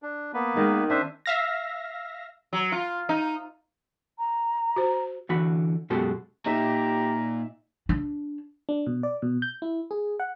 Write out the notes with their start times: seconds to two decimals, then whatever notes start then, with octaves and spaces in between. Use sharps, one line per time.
0.02 D4
0.34 A#3 B3 B4
0.56 D#3 G#3
0.90 C#4 D4 C5 E5
1.26 E5 F5 A#6
2.53 F#3
2.72 F4
3.09 D#4
4.19 A#5
4.76 F#4 C5
5.29 D3 E3 F#4 B5
5.90 F#2 B2 G#3 F#4 G4 A4
6.46 A#2 D#4 G4 E5 A#5
7.89 D4
8.69 D4
8.87 B2
9.03 D5
9.22 B2
9.42 G6
9.62 E4
9.91 G#4
10.20 F#5